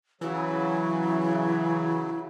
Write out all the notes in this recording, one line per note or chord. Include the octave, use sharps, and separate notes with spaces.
C#3 E3 F#3 E4